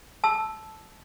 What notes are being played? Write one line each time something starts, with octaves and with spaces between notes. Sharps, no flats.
A5 C6 E6